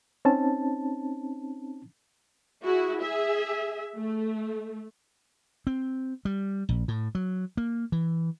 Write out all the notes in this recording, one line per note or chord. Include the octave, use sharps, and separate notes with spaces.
C4 C#4 D#4 A5
E4 F#4 G#4
G#4 E5
A3
C4
G3
A#1
A2
F#3
A#3
E3